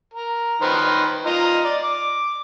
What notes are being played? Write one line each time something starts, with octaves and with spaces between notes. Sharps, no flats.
A#4
D#3 B4 C5
F4 D#5 A#5
D5
D6